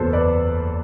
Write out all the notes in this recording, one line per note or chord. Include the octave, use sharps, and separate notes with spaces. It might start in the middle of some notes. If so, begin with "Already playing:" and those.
Already playing: F#1 E2 B2 F#3 A4 B4 C5
B4 D5